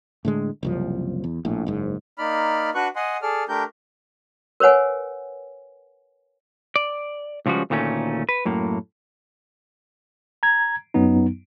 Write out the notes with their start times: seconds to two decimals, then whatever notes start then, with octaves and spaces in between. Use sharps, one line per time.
0.25 A2 D3 G#3
0.63 F#1 C2 F3
1.24 E2
1.45 A#1 A2
1.67 F#1 G#2
2.17 A#3 D#4 D5 B5 F6
2.75 D4 F#4 B4 C#6 F#6
2.96 D#5 F#5 G#5 C6
3.22 G#4 A4 D5 F6
3.49 A3 D4 G4 A#4 G6
4.60 A#4 B4 C#5 F#5 G#5
6.76 D5
7.46 C#2 C#3 F3 G3 F#4
7.70 D2 A#2 D#3 A3 C#4
8.29 B4
8.45 F#2 A2 A#3
10.43 A#5 G#6
10.94 F#2 F#3 B3 D#4